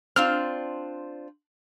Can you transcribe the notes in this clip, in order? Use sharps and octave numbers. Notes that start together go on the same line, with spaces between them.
C4 D4 F4 F6